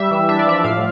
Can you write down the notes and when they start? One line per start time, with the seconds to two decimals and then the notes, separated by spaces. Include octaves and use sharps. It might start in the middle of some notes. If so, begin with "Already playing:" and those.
Already playing: G3 E5
0.11 E3
0.29 D4 E5
0.39 D5
0.46 F3 E5
0.64 A2 F5